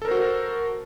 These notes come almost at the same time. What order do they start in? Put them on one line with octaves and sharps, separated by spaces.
A4 A#4 C5 F#4